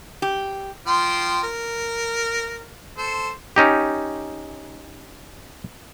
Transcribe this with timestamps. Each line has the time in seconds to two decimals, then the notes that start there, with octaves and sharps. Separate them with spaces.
0.22 G4
0.87 F3 G5 C6
1.43 A#4
2.97 A4 C5
3.56 C#4 D#4 G4